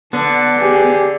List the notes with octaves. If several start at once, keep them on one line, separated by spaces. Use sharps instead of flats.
D3 B3 A5
G4 G#4